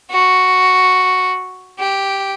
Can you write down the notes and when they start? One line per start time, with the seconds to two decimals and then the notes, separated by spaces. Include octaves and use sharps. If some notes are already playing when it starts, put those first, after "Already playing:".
0.10 F#4
1.79 G4